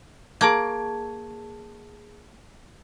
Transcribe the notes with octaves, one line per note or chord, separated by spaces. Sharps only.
A#3 G#4 A5 G#6